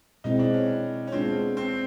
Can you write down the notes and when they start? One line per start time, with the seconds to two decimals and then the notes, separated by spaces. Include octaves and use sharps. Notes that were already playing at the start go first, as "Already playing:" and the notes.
0.24 B2 G#3 C4 D#4 E4
0.39 D4
0.54 C#4
1.07 C#4
1.12 G#3 B3 C4 D4 F4
1.57 C4